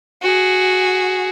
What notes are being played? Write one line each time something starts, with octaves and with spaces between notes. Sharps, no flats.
F#4 G#4